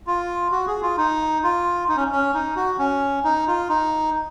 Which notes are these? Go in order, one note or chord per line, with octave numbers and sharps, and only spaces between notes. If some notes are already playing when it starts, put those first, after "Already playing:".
F4
F#4
G#4
F4
D#4
F4
D#4
C#4
C#4
D#4
F#4
C#4
D#4
F4
D#4